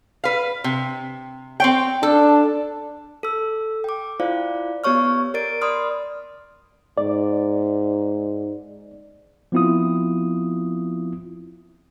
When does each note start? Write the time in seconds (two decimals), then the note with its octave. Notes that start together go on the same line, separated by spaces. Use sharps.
0.24 B4 F5
0.64 C3
1.60 C4 C#5 G5
2.03 D4 A4
3.23 A4 E6
3.84 G5 D6
4.20 E4 F4 C5 D5 F5
4.84 B3 G4 C#5 C#6 F6
5.34 A#4 D5 A6 D7
5.61 D5 B5 C6 D#6 F6
6.98 G#2 D5
9.52 F3 B3 C4 E4 F4 D#6